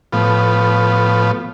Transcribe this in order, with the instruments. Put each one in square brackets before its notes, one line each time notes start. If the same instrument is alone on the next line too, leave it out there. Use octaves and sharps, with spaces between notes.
[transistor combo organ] A2 F3 B3